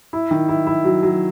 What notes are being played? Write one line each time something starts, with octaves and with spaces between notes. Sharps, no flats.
E4
D#3
E4
E4
F#3
F#3